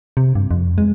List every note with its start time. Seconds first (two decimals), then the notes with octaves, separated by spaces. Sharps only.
0.17 C3
0.35 G2
0.51 F2
0.78 G#3